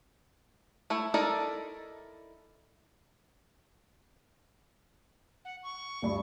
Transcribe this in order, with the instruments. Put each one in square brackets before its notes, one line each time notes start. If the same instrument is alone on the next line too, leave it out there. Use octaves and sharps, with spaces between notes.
[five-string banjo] A3 E4
D#4 E4 A4 A#4 D5
[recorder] F#5
C#6
[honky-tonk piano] D2 G2 B5